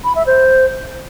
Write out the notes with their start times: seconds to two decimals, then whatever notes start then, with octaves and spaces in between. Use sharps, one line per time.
0.04 B5
0.15 E5
0.26 C5